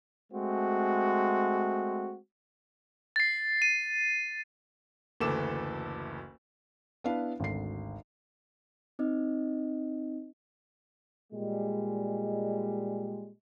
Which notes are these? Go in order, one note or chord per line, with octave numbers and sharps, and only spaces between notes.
G#3 A3 C4 F#4
A6 C7
D#7
F#1 D2 E3 A4 D6 E7
B3 D4 E4 B4 F5
G#1 D2 C7
C4 D#4 D#5
A#2 G3 G#3